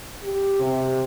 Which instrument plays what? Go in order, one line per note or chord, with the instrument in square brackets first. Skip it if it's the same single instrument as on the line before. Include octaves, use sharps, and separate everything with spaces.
[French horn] G4
[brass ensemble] C3